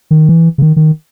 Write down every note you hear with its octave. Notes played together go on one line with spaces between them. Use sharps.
D#3
E3
C#3
D#3
D#3